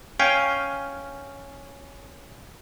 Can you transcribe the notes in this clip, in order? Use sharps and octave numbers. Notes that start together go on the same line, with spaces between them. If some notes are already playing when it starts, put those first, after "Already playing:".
C#4 F5 G5 G#5